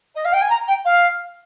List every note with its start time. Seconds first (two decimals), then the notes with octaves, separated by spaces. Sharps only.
0.15 D#5
0.24 F5
0.32 G5
0.41 G#5
0.49 A#5
0.67 G5
0.85 F5